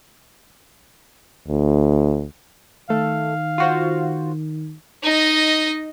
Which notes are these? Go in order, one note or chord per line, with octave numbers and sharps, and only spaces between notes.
D2
D#3 A3 A4 F5
F4 F#4 C5
D#4 D#5